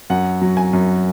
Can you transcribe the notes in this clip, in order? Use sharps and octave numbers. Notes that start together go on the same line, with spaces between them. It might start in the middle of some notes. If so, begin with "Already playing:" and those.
F#2 F#5
F#3
G#5
F#2